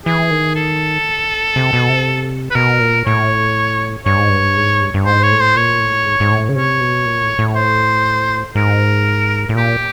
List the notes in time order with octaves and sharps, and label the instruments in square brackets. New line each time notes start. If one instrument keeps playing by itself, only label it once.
[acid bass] E3 [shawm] G#4
[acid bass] D#3
[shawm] A4
[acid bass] C3
B2
C3
[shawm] B4
[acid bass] B2 [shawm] A#4
[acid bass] A#2
[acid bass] A2 [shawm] C#5
[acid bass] G2 [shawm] C#5
[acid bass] G#2
G2
G#2
G2
G2
[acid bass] G#2 [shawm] C5
[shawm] C#5
[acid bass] A2
[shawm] C5
[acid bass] A#2 [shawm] C#5
[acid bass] A2
G#2
G#2
A2
C#3
[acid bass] C3 [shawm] C#5
[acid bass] B2
A#2
A2
A2
[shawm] C5
[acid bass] G#2 [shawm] A#4
[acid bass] A2
[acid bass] A#2 [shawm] G4